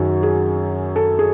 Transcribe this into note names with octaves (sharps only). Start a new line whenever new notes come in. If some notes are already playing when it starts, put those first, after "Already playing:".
Already playing: F#2 D#3 F#3 G#4
G#4
A4
G#4